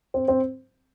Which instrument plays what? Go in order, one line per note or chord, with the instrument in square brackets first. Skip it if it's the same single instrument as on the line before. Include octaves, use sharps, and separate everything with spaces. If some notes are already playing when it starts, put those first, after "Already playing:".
[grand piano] C4
C4